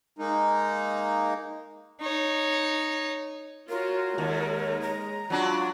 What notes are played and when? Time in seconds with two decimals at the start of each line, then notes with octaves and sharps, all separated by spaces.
0.19 G#3 A#3 D#4
2.01 D#4 C#5
3.69 F4 F#4 A#4 C#5
4.18 D#2 G#3
4.81 A#5
5.30 F#3 D4 F4 F#4